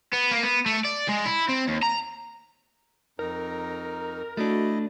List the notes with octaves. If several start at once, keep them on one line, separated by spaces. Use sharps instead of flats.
B3
A#3
B3
A3
D5
G#3
E4
C4
D#2
A#5
F2 D#4 A#4
A3 D4 E4 F#4 D#5